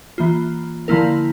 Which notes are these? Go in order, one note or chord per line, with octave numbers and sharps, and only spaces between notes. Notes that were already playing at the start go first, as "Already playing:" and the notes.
E3 A#3 F4
D3 F3 A#3 E4 A#4